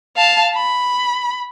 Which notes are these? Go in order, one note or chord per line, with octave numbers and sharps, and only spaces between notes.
F5 A5
B5